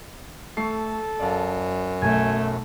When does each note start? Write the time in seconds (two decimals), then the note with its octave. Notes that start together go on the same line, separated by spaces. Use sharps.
0.57 A3 A4 C#6 C7
1.20 F#2 D5 F5 A5
2.02 B1 A3 G#5